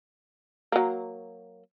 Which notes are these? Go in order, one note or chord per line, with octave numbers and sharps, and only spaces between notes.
F#3 A#3